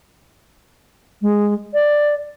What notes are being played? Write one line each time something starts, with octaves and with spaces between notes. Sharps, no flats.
G#3
D5